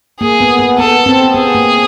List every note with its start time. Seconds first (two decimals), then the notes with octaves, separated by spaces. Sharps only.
0.21 A#3 G#4
0.41 B3
0.59 B3
0.78 B3 A4
1.06 C4
1.35 B3 G#4
1.55 A#3